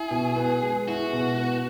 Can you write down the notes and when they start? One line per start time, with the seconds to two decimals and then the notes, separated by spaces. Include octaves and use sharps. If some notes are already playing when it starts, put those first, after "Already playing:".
Already playing: E4 G#4
0.11 B2
0.36 B3
0.63 G#3
0.88 E4 F#4
1.13 B2
1.39 B3